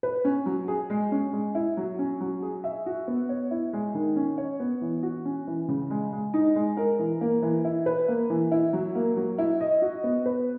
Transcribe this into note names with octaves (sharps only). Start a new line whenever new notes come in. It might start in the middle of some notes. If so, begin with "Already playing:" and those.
B4
C#4
F#3
G#4
G#3
C#4
G#3
E4
F#3
C#4
F#3
G#4
E5
F#4
B3
C#5
E4
G#3
D#3
C#4
C#5
B3
E3
F#4
C#4
E3
C#3
G#3
G#3
D#4
G#3
A#4
E3
A#3
E3
E4
B4
A#3
E3
E4
F#3
A#3
F#3
E4
D#5
F#4
B3
B4